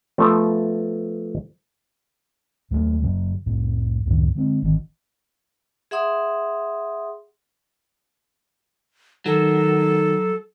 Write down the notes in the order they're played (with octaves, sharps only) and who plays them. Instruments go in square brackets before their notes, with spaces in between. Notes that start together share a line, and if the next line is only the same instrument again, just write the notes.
[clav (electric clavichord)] F3 A3 B3
[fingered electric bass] D#2 F#3 G#3 A3
F#2 C#3 F#3
C2 F2 A2
C#2 F#2 A2 D#3
D3 G#3 C4
G#1 D#3
[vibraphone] G#4 E5 F#5 C6 D#6
[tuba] D#3 [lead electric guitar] F#3 [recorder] A4